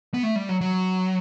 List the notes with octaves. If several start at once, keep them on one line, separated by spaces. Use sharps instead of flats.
B3
A3
G3
F#3
F#3